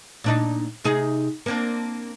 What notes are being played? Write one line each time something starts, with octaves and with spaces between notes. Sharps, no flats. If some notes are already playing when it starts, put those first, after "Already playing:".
A#2 D4 D#4
C3 D#4 G#4
A#3 C4 D4